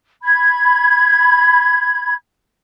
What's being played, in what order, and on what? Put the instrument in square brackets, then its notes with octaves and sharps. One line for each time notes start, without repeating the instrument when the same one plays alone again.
[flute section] B5 G#6